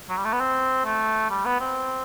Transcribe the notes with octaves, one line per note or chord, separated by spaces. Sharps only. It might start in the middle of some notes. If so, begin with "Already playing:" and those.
F#3
G3
A3
B3
C4
A3
G3
B3
C4